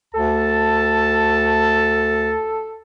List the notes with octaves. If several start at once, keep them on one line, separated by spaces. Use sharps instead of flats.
D2 A4 A5